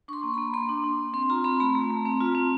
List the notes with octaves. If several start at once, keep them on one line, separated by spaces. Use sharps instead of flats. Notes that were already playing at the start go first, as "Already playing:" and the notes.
D4 C6 C#6
A#3
A#3 B5
A#3 C6
D4
D4
D4
C4 C6
F4 A#5
C4 B5
A3 A#5
A3
A3
C4
F4
C4